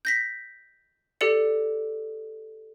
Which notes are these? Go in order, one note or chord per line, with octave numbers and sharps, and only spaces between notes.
G6 A#6 B6
G4 A4 D5 C#7